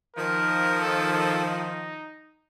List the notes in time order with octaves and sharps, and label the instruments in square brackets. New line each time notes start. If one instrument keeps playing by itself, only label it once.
[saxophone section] D#3 F3 [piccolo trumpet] A#4
[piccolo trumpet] A4
A4
D#4